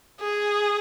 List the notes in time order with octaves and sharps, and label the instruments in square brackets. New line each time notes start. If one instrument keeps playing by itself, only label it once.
[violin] G#4